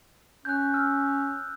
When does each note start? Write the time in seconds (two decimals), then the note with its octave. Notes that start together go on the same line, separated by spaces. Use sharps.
0.45 C#4 F#6 G6
0.74 E6 F6